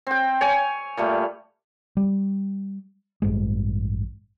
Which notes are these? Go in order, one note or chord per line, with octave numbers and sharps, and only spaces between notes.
C4 G5
C#5 G#5
A#2 G3 A3
G3
A1 G2 G#3